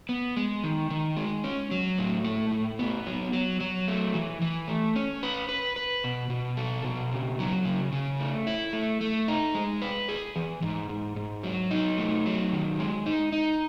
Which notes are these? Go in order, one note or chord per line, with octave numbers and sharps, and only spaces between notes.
B3
G#3
D#3
D#3
G#3
C#4
F#3
A2
A3
A2
B3
F#3
F#3
F#3
A3
E3
E3
A3
C#4
B4
B4
B4
B2
B2
A4
B2
C#3
F#3
C#3
C#3
A3
E4
A3
A3
D#4
G#3
B4
G#4
E3
G#2
G#2
G#2
F#3
D#4
A3
F#3
D#3
G#3
D#4
D#4